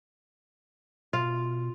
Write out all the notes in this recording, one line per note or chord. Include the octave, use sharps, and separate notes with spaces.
B2 F4